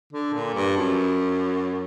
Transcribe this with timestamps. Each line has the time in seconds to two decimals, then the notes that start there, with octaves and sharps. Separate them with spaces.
0.13 D3
0.34 A#2
0.54 G2
0.76 F#2